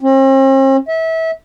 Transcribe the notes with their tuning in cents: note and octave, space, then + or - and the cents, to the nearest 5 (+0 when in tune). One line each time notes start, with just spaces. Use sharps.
C4 +45
E5 -30